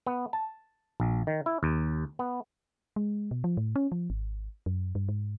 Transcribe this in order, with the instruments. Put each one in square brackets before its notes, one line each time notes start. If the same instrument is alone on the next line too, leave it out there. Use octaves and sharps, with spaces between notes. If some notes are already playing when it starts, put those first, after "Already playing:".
[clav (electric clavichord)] B3
A5
A#1
D#3
E4
D#2
B3
[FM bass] G#3
B2
F3
A2
C#4
F3
G#1
F#2
G2
G#2